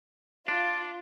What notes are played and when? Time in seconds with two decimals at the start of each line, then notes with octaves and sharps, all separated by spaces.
0.48 D4 F4